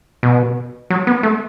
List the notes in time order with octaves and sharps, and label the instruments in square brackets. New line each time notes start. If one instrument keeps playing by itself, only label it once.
[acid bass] B2
F#3
B3
A3